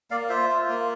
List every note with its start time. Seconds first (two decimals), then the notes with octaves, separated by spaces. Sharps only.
0.11 A#3 D5 F5
0.29 F4 C5 E5
0.49 F4
0.69 A#3